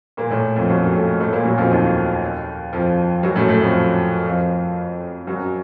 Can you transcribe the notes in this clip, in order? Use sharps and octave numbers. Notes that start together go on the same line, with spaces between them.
A#2 A#3
A2 A3
F2 F3
F#2 F#3
A2 A3
A2 A3
A#2 A#3
F#2 F#3
F2 F3
D#2 D#3
F2 F3
F#2 F#3
A2 A3
A2 A3
F2 F3
F2 F3
F#2 F#3